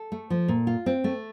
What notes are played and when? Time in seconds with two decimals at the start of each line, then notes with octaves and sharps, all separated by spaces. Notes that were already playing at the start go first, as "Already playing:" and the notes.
Already playing: A4
0.12 A3
0.30 F3
0.48 A#2
0.67 F4
0.86 C4
1.04 A3